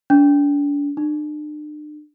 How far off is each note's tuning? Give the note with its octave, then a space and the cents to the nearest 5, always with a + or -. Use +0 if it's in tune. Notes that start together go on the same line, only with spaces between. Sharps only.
D4 -35
D4 +40